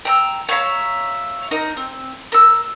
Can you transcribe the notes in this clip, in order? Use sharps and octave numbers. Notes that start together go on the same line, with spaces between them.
G5 A#5 E6
C#5 E5 F5 A#5
D#4 A#4 A#5
C4
A#4 E6